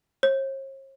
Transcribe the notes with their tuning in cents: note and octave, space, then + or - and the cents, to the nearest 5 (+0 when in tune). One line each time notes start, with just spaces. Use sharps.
C#5 -45